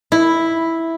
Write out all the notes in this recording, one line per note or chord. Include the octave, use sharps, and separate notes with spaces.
E4